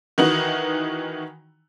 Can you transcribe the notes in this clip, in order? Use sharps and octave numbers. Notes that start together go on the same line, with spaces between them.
D#3 E3 D#4 F#4